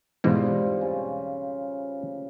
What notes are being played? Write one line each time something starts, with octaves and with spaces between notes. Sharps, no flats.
E2 G#2 B2 G3 C4 F4
C#3